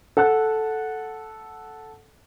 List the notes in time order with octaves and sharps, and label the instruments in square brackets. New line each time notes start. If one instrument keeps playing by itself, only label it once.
[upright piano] A4 F#5 A5 F#6